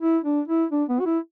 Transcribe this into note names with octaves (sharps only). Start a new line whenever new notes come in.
E4
D4
E4
D4
B3
F#4
E4